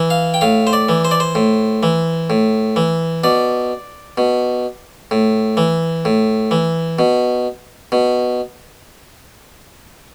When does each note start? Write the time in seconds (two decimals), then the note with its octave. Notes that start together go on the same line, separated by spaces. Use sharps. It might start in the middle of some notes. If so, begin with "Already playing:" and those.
Already playing: E3
0.10 F5
0.34 G5
0.41 A2 F5
0.67 C5
0.73 D5
0.89 E3
1.05 C5
1.11 D5
1.20 C5
1.35 A2
1.83 E3
2.30 A2
2.76 E3
3.24 B2 D5
4.18 B2
5.11 A2
5.57 E3
6.05 A2
6.51 E3
6.99 B2
7.92 B2